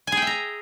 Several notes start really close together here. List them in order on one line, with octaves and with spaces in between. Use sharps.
G#5 G#4 G5 E5 A#5